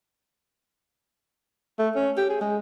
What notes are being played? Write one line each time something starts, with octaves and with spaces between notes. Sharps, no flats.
A3
C#4
G4
G#4
G#3